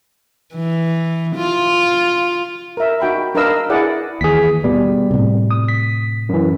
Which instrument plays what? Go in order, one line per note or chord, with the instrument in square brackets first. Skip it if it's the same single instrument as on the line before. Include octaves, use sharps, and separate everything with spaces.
[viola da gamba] E3
F4
[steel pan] A#4 E5
D#4 F#4 G5 B5
D4 A#4 B4 D#5 F5 E6
E4 G#4 D5 F#5
[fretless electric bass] D#2 E3 [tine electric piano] G#4 B6
[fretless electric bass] B2 B3 [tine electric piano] G3
[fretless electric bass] A2 C3
[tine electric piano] D#6
B6
F#2 E3